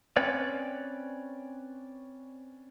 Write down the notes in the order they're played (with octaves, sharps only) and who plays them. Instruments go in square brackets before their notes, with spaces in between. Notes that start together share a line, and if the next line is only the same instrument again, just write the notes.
[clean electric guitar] C4 C#4 B4 C#5 D5